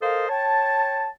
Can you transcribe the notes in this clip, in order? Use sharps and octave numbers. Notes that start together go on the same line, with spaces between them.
A4 A#4 C5 D#5 F5
C#5 G5 A5